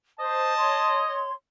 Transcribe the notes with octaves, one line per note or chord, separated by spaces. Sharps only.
C5 D#5 A5
C#5 C6